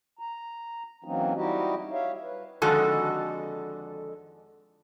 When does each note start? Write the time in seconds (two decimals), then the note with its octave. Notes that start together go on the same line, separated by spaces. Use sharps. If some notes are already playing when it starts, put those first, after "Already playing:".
0.19 A#5
1.04 E3 F#3 A#3 C4 C#4 D#4
1.35 G3 D#4 E4 F#4 G4 D#5
1.92 C#5 E5 F5
2.22 B4
2.62 F2 D3 D#3 G#3 F#4 A4